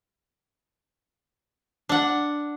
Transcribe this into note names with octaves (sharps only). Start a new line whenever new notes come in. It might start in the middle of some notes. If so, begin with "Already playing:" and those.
D4 F#5